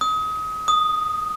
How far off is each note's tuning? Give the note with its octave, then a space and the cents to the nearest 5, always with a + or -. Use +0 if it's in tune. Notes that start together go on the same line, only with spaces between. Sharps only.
D#6 +30
D#6 -5